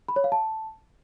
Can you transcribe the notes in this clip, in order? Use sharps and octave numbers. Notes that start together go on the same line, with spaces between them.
B5
C#5
F5
A5